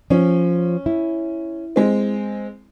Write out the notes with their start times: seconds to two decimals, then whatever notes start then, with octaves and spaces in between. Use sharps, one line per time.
0.10 F3 C#4
0.86 E4
1.76 G#3 C4